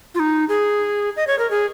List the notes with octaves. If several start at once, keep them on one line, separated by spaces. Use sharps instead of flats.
F4
D#4
G#4
D#5
C#5
A#4
G#4